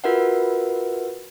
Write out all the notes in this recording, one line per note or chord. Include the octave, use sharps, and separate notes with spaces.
F4 F#4 A#4 B4 E5 F#5